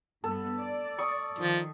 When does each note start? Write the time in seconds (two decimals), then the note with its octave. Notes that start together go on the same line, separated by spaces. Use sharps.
0.24 G2 B3 A4
0.60 D5
0.98 C#6 D#6
1.39 D#3 F3